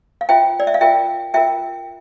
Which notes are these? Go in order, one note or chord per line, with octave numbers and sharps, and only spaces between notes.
F5
F4 C5 E5 G5
D5
E5
F5
F4 A#4 E5 G5
F4 A#4 E5 G5